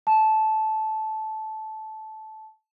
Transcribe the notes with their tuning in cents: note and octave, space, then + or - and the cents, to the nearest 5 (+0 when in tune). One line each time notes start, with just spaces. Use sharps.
A5 -15